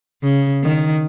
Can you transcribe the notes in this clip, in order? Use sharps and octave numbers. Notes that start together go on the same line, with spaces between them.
C#3
D#3